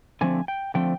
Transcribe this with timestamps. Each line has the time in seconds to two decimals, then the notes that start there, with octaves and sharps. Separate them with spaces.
0.21 D3 F3 A3 C4 G#5
0.48 G5
0.74 D3 F3 A3 C4 G5